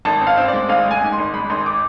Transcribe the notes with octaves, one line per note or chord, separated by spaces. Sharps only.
G#1 A5
C4
F5
C4
D5
G#3
G#1 F5
G#3
G#5
G#2
C6
G#1
G#3 B5
G#1 C6
D6